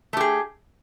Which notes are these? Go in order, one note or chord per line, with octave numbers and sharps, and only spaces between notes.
A3 G4 G#4